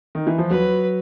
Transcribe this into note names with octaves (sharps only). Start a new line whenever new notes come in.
D#3
E3
F3
F#3 B4